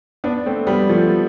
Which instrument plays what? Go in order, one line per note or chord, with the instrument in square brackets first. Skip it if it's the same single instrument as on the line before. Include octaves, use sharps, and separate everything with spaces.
[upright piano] B3 D4
A3 C4
G3 B3
F3 A3